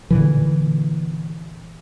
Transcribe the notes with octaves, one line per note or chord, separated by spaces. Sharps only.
A#2 D3 E3